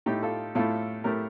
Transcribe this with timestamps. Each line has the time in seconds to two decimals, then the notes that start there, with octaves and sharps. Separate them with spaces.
0.06 A2 A3 D#4 G4
0.23 F4 A4
0.55 A2 A3 F4 A4
1.04 A2 A3 G4 A#4